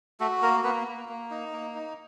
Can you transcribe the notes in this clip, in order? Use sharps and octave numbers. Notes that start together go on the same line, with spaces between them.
A3 F#4 A4
A#3 A#4
A#3 B3 B4
A#3
A#3
D#4
A#3
D#4